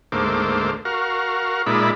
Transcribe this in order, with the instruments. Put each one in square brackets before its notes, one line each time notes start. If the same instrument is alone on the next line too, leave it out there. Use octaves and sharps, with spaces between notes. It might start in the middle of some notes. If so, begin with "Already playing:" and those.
[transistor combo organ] D2 G#2 A3 A#3 C5 D6
F#4 A#4 F5
A#2 G#3 D#4 D5 E5 B5